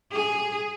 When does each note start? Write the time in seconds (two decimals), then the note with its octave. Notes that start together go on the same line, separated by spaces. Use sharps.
0.12 G#4